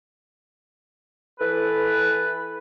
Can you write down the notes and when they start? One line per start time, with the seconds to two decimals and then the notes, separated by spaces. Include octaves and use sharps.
1.40 E3 A4 B4